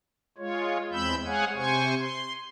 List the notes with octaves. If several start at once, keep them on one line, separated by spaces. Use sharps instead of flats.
G#3 F4 C#5
E2 G#3 C4 B5 E6 G6
G#3 G#4 C#5 F5 F#5 G#5
C3 C5 G#5 C#6
C6